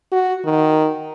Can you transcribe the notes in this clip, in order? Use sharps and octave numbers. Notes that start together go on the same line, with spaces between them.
F#4
D#3